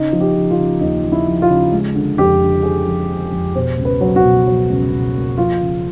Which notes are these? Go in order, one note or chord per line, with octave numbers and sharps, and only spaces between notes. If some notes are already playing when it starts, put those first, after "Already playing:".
Already playing: C#3 D#4
F3
G4
F3
F4
C#3
D#2 D#4
F3
E4
F3
F4
C#3
G#3
D3
F2 G4
D3
D3 G#4
F3
D3
F2
B2 C5
C#2
B4
F#3
F#4
B2
F#3
C#2
B2
A#3
F3 F4
C#3